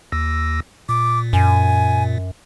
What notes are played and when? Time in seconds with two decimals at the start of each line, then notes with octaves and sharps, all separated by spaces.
0.12 D#2 E6 A#6
0.89 A#2 D6
1.33 F#2 G#5